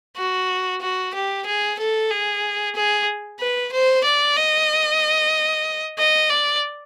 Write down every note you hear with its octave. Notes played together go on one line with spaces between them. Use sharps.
F#4
F#4
G4
G#4
A4
G#4
G#4
B4
C5
D5
D#5
D#5
D5